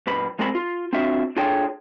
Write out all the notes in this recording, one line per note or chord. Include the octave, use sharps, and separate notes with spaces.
F#2 A#2 B4 B5
C2 G#3 C4 A#4 A5 B5
F4
C4 D4 F4 F#4 E5
D4 F4 G#4 A4 C#5 G5